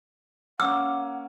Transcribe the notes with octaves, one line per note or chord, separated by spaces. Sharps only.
A#3 C#4 F#5 D6 E6